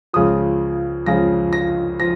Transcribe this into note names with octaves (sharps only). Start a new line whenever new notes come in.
C#2 C#3 F3 D#6
C#2 C#3 F3 A#6
A#6
F3 A#6